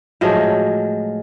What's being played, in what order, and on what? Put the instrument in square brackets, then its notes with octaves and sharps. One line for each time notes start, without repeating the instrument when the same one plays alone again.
[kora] A2 F3 F#3 G#3